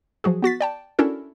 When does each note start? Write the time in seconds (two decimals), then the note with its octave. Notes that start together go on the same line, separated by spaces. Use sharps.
0.24 F3 F#3 F#4 G#4
0.42 B3 F#4 A6 B6
0.61 D5 G5 A5
0.99 C#4 D4 E4 F#4 A4 A#4